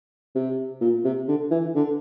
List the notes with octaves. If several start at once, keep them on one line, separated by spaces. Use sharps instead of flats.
C3
A#2
C3
D3
E3
D3